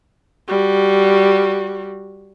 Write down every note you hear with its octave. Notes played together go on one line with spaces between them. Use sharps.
G3 F#4